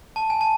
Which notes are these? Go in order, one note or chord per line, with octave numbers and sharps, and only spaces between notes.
A5
G#5
A5